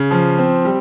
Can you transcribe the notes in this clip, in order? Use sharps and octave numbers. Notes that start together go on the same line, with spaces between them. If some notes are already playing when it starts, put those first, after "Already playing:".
Already playing: C#3
F3
C4
G3